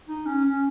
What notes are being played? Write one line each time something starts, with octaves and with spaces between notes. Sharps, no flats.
D#4
C#4
C#4